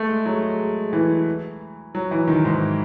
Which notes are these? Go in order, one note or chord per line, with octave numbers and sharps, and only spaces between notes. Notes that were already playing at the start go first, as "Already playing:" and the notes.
Already playing: A3
G#3
F#3
G#3
G#3
E3
F#3
E3
D#3
G#2